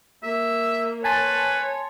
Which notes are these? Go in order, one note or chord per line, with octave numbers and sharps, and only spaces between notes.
A#3 E5
B4 C#5 G#5 A5 C6